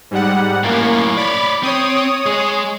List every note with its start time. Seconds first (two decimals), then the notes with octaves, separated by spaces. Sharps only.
0.11 G#2 G3 F#5
0.64 F#2 A2 A#3
1.17 C#5 D5 B5
1.63 C4 C#5 D#6
2.26 G#3 G#4